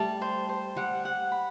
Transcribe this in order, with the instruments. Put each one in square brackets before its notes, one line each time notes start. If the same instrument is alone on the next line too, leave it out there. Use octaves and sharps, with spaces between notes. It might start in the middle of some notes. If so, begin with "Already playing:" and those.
Already playing: [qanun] G3 A3 [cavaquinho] A5
[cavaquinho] C5
C5
[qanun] G3 [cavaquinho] F#5
[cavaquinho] F#5
B5